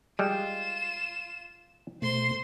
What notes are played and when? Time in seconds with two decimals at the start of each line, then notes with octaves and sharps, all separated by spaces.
0.19 G3 G#3 F4 E7
2.02 B2 A3 C5 C6